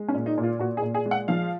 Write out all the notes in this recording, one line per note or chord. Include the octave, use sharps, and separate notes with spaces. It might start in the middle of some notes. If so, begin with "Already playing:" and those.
Already playing: G#3
C#4
A#2
D#4
A#2
F4
A#2 F#4
G#4
A#2
G#4
G#3
F#5
F3 F5